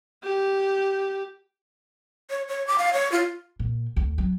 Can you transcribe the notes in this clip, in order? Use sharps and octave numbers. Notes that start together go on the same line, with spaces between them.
G4
C#5
C#5
D6
F5
C#5
F4
A#2
D2
F#3